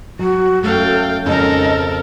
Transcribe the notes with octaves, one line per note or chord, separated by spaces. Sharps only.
F#3 F#4
F#2 A3 A4 F5 G5
F2 G#2 C#3 F3 C#4 A4 A#4 D#5